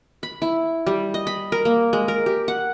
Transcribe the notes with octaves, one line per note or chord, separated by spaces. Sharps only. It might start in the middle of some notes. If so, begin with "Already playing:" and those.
B5
E4
G3
D#5
B5
A#4
A#3
G#3
A#4
G4
F#5